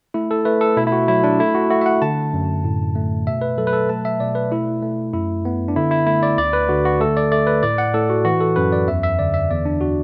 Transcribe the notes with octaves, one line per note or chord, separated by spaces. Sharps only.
A3 E4
A4
A3 B4
A4
B2 E4
E4
F#4
F#3 E4
D4
A3 E4
F#4
A3 F#4
E5
F#5
D3 A5
F#2
A2
A3
B2 E5
B4
F#3 A4
B4
A4
A3 A5
E5
B2 D5
B4
A3 E4
A3
F#2 E4
B3
D4
D3 E4
E4
A3 E4
D5
D2 D5
B4
D3 F#4
F#4
A3 A4
D5
A3 D5
B4
A2 D5
F#5
A2 A4
F#4
E3 F#4
A4
F#2 B4
D5
E2 E5
E5
D3 D5
E5
E2 D5
D4
F#4